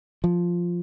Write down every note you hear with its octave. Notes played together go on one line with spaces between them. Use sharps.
F3